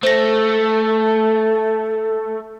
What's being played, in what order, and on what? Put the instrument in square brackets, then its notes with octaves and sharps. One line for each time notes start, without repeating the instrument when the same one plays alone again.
[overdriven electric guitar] A3 [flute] A4 [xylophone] C5 A#6